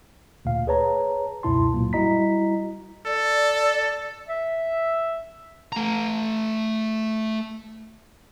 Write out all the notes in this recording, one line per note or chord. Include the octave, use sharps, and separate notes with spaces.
D2 A#2 F5
G#4 B4 C#5 A5 A#5
C#2 F#2 B2 E4 A5 C6
A#2 F#3 A#3
G3 E4 F#4 D#5 A#5 B6
A4 D5
E5
A3 A#5